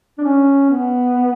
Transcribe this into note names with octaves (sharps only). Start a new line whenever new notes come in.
D4
C#4
B3